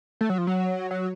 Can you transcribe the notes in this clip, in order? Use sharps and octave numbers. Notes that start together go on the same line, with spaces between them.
A3
F#3
F3
F#3
F#3